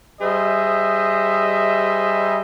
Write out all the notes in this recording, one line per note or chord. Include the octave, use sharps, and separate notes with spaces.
G3 G#4 C5 D#5 E5